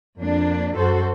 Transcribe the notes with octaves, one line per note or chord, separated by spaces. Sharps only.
F2 A#3 D4
F#2 F#4 A4 C5